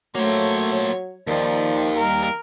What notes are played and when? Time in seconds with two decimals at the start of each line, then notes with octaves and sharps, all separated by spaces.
0.15 F#3 A3 A#3 C5 C#5
1.27 D#2 D#3 F3 D5
1.97 G3 A#4